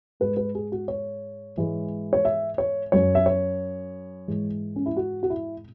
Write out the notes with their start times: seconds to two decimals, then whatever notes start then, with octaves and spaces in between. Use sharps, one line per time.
0.20 G#2 G#3 B4
0.37 B4
0.55 G#4
0.72 F#4
0.88 C#5
1.56 G#2 E3 G#3
2.13 C#5
2.25 E5
2.58 C#5
2.92 F#2 F#3 C#5
3.15 E5
3.26 C#5
4.28 G#2 E3 G#3
4.76 C#4
4.86 E4
4.97 F#4
5.23 F#4
5.30 E4